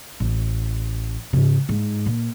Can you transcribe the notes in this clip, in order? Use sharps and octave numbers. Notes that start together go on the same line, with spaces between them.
A1
G#2 C#3
G#2
A#2